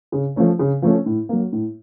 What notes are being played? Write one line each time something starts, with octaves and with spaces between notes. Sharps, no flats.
C#3
F3 A3 C#4
C#3
F3 A3 C#4
A2
F#3 A#3
A2